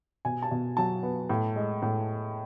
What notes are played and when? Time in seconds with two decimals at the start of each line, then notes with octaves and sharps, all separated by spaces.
0.25 B2 G#5
0.42 A5
0.51 B2
0.77 F#3 A5
1.03 B3
1.30 A2
1.56 G#3
1.82 A2